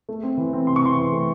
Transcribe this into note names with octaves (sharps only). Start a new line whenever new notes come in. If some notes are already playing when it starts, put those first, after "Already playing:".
A3
C4
E3
C4
C3 C6
C#6
E3 C6
E3
A3